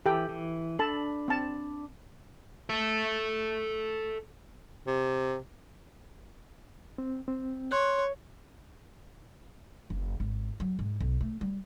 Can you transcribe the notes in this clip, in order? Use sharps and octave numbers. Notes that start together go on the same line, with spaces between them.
E3 G4 A4 G5
E3
D4 A4 A5 B5
C4 A5
A4 E5
C3
C4
C4
C#5 C6 F#6
F#1
G#1
F#3
G#2
B1
A3
G3